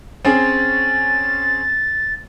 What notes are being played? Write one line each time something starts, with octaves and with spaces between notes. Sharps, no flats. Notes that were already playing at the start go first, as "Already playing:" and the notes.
C4 C#4 G#4 A6